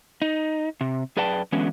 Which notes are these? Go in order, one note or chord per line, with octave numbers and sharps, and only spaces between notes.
D#4
C3
F#2 G#4 B4 D5 G5 A5
D3 E3 F#3 G#3 B3 C#4